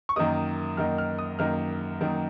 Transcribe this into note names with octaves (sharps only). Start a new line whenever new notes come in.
C#6
F#2 D#3 A#3 D#4 D#6
F#2 D#3 A#3 D#4 F6
F6
D#6
F#2 D#3 A#3 D#4 F6
F#2 D#3 A#3 D#4